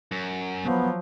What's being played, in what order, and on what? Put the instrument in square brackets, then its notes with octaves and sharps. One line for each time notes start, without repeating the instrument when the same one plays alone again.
[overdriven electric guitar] F#2
[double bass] F3 F#3 [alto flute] B3